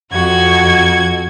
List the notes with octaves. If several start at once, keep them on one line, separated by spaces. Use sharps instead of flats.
F2 F#4 G#6